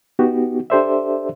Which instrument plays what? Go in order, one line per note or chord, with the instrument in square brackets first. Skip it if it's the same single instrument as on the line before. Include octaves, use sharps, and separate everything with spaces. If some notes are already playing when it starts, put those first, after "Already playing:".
[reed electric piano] B3 D#4 F#4 G4
D4 G4 A4 C5 D5 E5